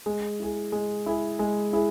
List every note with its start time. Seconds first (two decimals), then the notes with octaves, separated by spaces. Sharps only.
0.06 G#3
0.40 E4 G#4
0.72 G#3
1.06 E4 G#4
1.39 G#3
1.73 E4 G#4